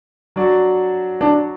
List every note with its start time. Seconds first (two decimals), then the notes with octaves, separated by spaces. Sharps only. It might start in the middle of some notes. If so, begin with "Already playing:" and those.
0.36 F#3 D4 F#4 D5
1.21 D4